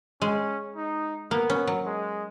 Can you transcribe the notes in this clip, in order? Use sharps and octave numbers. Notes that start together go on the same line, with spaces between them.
G#3 C#4
D#4
A#3 B3
C#4
F#3
G#3